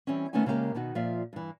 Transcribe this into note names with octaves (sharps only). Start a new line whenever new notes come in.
E3 G3 C4 C#4
D#3 A3 B3 C#4 D#4 G#5
C#3 G#3 A#3 B3 G4 A#4
B2 D#3 D#4 F#4
A#2 F3 F4 D5 E5 F5
G2 E3